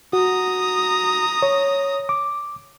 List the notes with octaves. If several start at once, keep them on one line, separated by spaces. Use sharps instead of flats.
F#4 A#5 D#6
C#5
D6